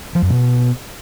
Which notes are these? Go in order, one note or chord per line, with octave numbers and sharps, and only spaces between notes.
F3
F#2
B2